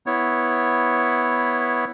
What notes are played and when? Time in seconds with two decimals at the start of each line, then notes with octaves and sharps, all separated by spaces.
0.06 B3 E4 C#5